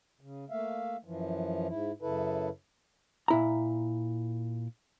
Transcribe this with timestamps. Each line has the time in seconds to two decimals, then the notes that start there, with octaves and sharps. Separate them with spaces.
0.21 C#3
0.50 A3 A#3 E5 F5
1.05 F#2 E3 F3
1.67 G#2 E4
2.02 F#2 C#3 E4 A4 B4
3.28 A#2 E4 A#5